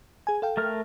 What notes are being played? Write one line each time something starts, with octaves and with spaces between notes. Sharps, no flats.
G#4 G#5
A4 F5 G5
A3 A#4 F6